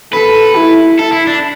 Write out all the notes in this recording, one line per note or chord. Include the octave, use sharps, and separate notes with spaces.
A4 B4
E4
A4
E4
D4